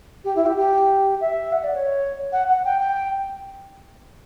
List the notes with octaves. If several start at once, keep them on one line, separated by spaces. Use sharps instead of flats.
G4
E4
G4
G4
E5
F#5
D5
C#5
F#5
F#5
G5
G5